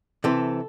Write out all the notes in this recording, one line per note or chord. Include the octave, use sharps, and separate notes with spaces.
C3 E3 A4